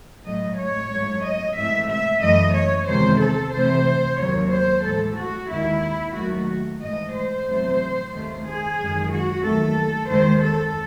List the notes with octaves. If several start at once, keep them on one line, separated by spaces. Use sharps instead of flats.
A2 F#3 A3 D#5
C#5
G#2 F#3 A3
D#5
G#2 E3 A3 E5
E5
F#2 E3 A3 D#5
C#5
E2 C3 D#3 G#3 C5
A4
C3 E3 A3 C5
D#2 D#3 F#3 C#5
C5
A2 E3 G#3 A4
F#4
D#2 D#3 G#3 E4
D#2 D#3 F#3 A3 F#4
G#2 E3 A3 D#5
C5
E2 C3 F#3 A3
D#2 D#3 A3
G#4
F#2 D#3 G#3
F#4
D#2 D#3 F#3 A3 A4
D#2 D#3 G#3 C5
A4